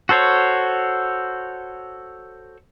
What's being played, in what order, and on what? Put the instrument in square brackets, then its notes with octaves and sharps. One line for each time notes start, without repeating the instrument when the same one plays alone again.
[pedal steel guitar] F#4 A4 C5 C#5